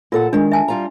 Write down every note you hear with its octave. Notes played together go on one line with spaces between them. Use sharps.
A#2 F4 A4 F#5
D#3 G#3 D4
E5 G#5 A5
G3 F4 A#5